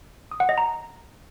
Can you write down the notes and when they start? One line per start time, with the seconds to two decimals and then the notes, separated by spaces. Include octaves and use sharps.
0.31 D#6
0.40 F#5
0.49 D#5
0.58 A#5